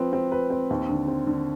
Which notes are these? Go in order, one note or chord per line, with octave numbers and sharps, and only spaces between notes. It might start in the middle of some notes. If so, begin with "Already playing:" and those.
Already playing: F3 C4 B4
C4
B4
C4
D#2
D3
C4
D3